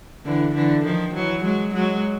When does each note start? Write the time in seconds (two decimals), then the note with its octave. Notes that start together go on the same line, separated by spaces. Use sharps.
0.25 D3 E3
0.54 D3 E3
0.84 D#3 F3
1.14 E3 F#3
1.44 F#3 G#3
1.74 F#3 G#3